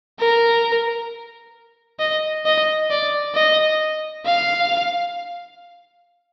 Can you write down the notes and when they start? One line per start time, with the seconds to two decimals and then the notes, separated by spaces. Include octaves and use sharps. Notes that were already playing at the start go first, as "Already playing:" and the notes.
0.20 A#4
1.99 D#5
2.46 D#5
2.91 D5
3.35 D#5
4.25 F5